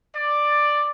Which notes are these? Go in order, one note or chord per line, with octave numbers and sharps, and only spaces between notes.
D5